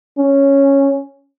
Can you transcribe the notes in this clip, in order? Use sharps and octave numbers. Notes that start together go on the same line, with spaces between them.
C#4